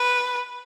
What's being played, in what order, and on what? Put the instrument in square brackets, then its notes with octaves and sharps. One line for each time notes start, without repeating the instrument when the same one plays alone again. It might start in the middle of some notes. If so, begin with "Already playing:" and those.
Already playing: [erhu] B4